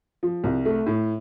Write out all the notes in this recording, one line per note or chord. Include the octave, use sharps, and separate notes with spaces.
F3
C2
A3
A2